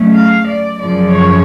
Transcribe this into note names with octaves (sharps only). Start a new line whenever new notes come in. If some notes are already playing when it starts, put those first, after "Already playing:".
Already playing: C#3 F#3 A3 C#4
F5
D5
F#2 C#3 F3 D5
C#5